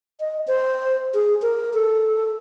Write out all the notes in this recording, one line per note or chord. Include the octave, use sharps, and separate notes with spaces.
D#5
C5
G#4
A#4
A4